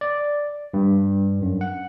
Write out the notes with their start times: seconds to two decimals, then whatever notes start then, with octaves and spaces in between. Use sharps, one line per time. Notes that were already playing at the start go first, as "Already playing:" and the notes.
0.01 D5
0.74 G2
1.42 F#2
1.61 F#5